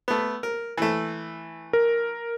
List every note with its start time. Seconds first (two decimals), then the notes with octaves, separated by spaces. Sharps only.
0.08 A3 B3
0.43 A#4
0.78 E3 A3
1.73 A#4